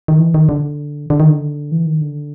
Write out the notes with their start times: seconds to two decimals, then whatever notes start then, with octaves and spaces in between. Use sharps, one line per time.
0.08 D#3
0.19 E3
0.34 D#3
0.49 D3
1.10 D3
1.20 D#3
1.30 D3
1.72 E3
1.86 D#3
2.01 D3